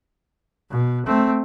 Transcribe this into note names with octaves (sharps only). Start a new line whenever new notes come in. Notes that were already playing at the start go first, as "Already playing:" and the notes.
B2
A3 C4